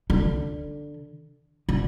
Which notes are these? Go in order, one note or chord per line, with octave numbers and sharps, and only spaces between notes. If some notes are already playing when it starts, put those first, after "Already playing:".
D3
D3